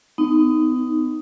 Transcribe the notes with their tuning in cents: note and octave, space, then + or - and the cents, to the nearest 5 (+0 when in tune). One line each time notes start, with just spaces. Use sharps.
B3 +40 D#4 +0